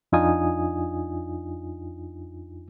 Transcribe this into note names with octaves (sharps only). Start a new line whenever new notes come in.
F2 D4 D#4 F4 G#5 D#6